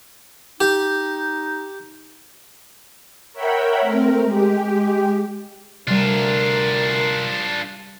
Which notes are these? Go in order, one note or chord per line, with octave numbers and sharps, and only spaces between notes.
D#4 G4
A#4 C#5 E5 F#5 G5 B5
A3 C4 A#4
G#3 G4
D2 C3 G3 D4 F4 A#4 A#5 F6